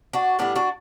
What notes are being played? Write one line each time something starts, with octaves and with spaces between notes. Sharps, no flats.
D4 F#4
A2 G3 B3 D4
D4 F#4